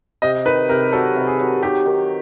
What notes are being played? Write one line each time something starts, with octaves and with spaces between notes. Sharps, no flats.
C3 D#5
D#3 B4
C3 A#4
F#3 A4
C3
G#4
F#3
D#3 G4
D#3